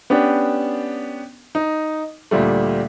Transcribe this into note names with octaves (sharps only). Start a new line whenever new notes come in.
B3 C#4 D4 G4
D#4
D2 A#2 G3 A3